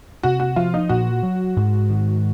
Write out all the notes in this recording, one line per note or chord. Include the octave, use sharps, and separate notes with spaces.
C3 F#4
F#4
F3 F4
D#4
A#2 F#4
F#3
G#2
D#3